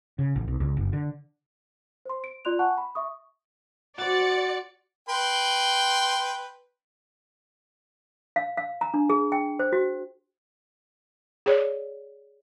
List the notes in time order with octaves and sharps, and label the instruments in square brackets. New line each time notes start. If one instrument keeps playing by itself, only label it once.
[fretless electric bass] C#3
A1
B1
C#2
F#1
D3
[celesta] C5 C6
D7
F4 D5 C6 F#6 F7
F#5 G#5 A5 C#6 F#6
B5
E5 C#6 D#6
[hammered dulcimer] F#4 C5 [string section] D5 C#7 [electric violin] A6
[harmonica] B4 G5 C6
[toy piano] F5
F5
A#5
D4
G#4
G5
C5
F#4
[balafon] G#4 C#5 D5